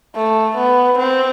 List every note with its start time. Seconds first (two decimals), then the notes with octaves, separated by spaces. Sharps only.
0.16 A3
0.57 B3
0.99 C4